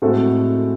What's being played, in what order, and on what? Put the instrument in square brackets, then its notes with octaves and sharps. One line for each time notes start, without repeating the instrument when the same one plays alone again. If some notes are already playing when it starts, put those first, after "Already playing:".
[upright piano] A2 G#3 C4 F#4 A4